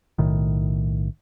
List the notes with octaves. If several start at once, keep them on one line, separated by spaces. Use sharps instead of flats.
B1 A2 D#3